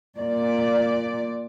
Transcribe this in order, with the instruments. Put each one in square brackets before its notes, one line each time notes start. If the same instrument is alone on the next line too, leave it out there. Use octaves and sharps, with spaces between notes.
[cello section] A#2 D5